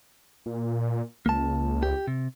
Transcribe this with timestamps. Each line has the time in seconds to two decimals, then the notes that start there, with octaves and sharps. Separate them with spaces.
0.46 A#2
1.26 C#2 A#3 A5
1.83 G4
2.08 C3